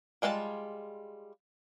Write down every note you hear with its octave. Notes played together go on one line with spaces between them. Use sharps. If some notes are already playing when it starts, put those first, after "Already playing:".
G3 G#3 F4 C5 A5